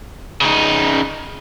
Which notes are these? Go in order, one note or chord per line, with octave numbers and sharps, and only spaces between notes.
C#3 D#4